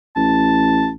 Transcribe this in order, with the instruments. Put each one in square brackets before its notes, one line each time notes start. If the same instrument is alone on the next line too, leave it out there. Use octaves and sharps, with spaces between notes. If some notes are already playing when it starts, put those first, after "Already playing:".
[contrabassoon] A1 [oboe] A5